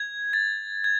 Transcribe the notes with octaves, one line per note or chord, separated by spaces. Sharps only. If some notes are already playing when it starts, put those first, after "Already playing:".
Already playing: G#6
A6
G#6